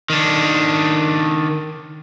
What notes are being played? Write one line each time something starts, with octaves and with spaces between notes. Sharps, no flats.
D#3 D4